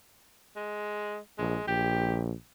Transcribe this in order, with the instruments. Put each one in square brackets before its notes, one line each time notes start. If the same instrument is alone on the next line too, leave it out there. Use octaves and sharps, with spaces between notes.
[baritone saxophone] G#3
[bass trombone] A#1 [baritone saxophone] G#3
[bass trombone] A#1 [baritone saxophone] G4